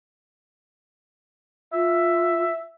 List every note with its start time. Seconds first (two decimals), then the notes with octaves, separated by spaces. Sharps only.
1.73 F4 E5